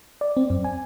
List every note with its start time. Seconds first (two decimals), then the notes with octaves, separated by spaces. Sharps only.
0.21 D5
0.37 C4
0.50 F#2
0.64 G#5